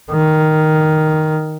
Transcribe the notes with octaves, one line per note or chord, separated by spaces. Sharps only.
D#3